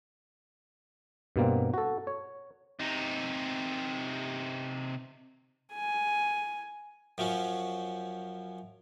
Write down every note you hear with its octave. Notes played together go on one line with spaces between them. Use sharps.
G2 B2 A#3 C4
F#4 A4
C#5
C3 D#4
G#5
F#2 F3 F#3 C#4